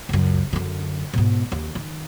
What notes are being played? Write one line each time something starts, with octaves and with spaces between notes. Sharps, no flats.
C#2 F#2
F#2 D3
G#2 B2
D#2
D#3